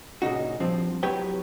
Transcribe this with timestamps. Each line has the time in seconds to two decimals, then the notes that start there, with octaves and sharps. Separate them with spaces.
0.22 A#2 C#3 D#4 F#4
0.60 G2 F3 C4
1.03 C2 F#3 G4 B4 C#5 G5